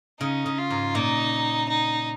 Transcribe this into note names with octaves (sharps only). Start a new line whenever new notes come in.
C#3 D#4
C#3
F4
G#2
A#2 D#4
D#4